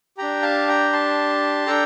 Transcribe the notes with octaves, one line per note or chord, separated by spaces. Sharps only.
D4 G4 G5 A#5
F5 A5
G5 A#5
A5 C6
D4 A4 G5 A#5